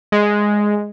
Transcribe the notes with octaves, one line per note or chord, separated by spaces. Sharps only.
G#3